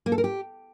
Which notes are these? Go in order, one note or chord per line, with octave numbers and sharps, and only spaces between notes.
A#3
A4
A#4
G4